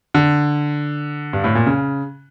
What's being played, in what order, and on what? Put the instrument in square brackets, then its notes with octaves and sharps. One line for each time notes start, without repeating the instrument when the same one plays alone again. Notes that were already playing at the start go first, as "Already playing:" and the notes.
[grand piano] D3
G2
A2
A#2
C#3